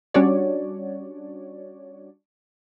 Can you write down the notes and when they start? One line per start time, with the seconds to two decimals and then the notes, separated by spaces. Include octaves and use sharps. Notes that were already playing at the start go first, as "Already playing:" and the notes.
0.14 G3 C#4 D4 F#4 C#5 D5